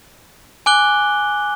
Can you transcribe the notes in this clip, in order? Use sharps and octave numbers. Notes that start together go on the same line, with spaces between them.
G#5 D6 F#6 G7